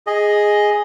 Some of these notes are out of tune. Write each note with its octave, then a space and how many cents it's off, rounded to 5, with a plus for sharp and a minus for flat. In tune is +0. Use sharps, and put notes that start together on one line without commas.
G#4 +0 D#5 +5